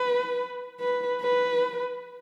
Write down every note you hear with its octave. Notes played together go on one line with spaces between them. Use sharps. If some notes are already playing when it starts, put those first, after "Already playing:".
Already playing: B4
B4
B4